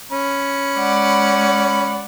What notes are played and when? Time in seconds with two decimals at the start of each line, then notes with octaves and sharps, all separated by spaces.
0.12 C#4 B5
0.77 G#3 D5 F#5